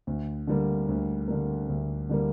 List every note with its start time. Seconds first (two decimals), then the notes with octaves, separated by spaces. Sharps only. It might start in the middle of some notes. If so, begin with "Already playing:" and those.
0.07 D2
0.47 D3 G3 A#3
0.89 D2
1.28 D3 G3 A#3
1.69 D2
2.09 D3 G3 A#3